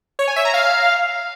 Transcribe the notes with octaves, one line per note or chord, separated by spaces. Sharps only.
C#5
G#5
E5
A#5
F5